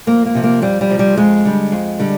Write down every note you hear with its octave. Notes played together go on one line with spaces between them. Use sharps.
F2 A#3
A#3
C3 F3
A#3
F2 G3
G3
C3 F3
G3
F2 G#3
D3 G3
F2
D3 G3